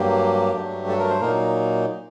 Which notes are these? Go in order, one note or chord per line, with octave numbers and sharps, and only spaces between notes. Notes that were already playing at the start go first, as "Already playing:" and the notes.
Already playing: G2 F#3 A#3 G4
G2 F#3 A3 D4
A4
A#4
C5
A#2 F#3 A#3 D#4 A#4